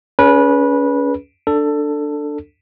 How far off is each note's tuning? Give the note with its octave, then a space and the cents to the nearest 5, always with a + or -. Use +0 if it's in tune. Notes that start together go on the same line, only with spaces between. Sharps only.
C#4 +30 G#4 +20 B4 -20
D4 +5 A4 +15